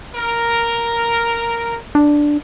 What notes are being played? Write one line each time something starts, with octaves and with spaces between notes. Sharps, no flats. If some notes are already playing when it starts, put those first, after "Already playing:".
A#4
D4